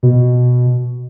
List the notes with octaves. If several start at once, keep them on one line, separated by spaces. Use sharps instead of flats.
B2